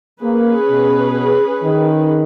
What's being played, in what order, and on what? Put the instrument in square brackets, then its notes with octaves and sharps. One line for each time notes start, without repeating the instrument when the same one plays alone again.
[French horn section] A#3 [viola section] C#4 G#4 B4
[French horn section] B2
D#3